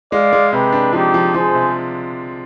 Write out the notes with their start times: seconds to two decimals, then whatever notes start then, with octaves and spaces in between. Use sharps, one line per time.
0.11 G#3 D5 F5
0.33 G#3
0.52 C3 G4 B4
0.72 D4
0.93 F3 D#4 G4
1.14 F3
1.34 F3 G#4 C5
1.55 C3